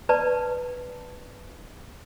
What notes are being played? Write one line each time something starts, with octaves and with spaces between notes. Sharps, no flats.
B4 D5 A5